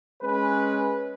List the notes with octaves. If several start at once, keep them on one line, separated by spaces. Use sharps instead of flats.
G#3 C#4 B4